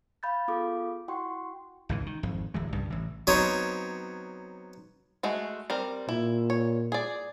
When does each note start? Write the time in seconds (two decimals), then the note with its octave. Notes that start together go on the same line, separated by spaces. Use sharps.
0.23 F5 B5 G6 A6
0.48 B3 F4 G#4 A4 F5 D6
1.08 E4 F#4 F#5 G5 C6 C#6
1.89 G#1 C#2 E3
2.06 D#3
2.23 G#1 F2
2.54 D1 E3 G#3
2.73 C2 G2 C#3
2.90 A1 E3
3.27 F#3 B3 C4 D#4 C#5
5.23 G#3 A3 F#4
5.70 G3 C4 A#4
6.09 A#2 E4
6.50 C#5
6.92 G#4 D5